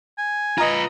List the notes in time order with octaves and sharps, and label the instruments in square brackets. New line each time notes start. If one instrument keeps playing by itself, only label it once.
[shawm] G#5
[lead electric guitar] F4 B4 [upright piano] D#5 A#5